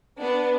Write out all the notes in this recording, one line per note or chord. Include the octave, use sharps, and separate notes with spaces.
B3 D4